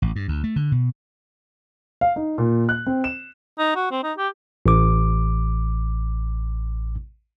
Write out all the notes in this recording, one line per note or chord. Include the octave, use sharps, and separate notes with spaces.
A1
G2
D2
A3
D3
B2
F5
D#4
A#2
F#6
C4
E7
D#4
F#4
C4
D#4
G4
A1 D6